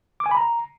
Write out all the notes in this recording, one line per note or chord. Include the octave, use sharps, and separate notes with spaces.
D6
G#5
B5
A#5